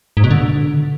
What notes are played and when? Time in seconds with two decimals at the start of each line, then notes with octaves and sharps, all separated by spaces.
0.17 G#2
0.24 B2
0.31 D3